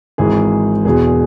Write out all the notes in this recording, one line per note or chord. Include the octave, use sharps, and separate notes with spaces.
G#1 G#2 E3 G#4
E1 E2 B2 G#4